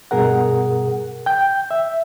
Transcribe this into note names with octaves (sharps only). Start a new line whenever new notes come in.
G2 B2 G#4 A#4 F#5
G5 G6
E5